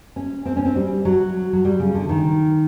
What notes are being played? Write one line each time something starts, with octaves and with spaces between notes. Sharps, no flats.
C#4
C4
C#4
C4
G3
F#3
F#3
G3
C#3
D3
D#3